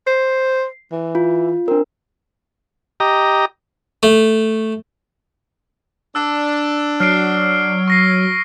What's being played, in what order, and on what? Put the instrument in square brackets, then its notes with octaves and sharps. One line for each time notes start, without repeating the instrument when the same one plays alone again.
[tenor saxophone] C5 [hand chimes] C7
[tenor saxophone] E3
[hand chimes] F4
[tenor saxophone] C4 [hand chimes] D4 A#4
[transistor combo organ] G4 D#5 A#5
[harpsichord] A3
[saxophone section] D4 [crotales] E6
[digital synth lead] F#3 [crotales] F6 C7 D7
[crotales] C#6 A#6 C7